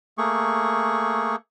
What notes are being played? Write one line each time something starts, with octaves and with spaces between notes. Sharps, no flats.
A3 A#3 G#4 C#6